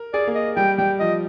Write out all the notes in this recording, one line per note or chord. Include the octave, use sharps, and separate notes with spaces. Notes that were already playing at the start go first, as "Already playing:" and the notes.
Already playing: A#4
G#4 D5
A#3
D#5
G3 G5
G3 G5
F3 D#5